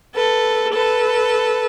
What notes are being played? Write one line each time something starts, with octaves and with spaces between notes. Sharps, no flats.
A4 B4
A4 B4